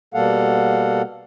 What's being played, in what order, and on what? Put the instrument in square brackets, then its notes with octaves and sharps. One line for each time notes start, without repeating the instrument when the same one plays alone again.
[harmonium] B2 G3 A#3 A4 F5 F#5